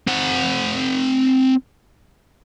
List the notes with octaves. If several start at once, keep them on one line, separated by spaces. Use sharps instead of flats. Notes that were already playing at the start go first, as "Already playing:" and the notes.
C4 F#5